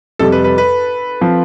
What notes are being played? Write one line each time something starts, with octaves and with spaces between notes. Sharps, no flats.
F2 C3 G3 A4
B4
B4
B4
F3 C4 F4